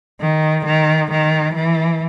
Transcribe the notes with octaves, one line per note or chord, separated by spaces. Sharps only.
D#3
D#3
D#3
E3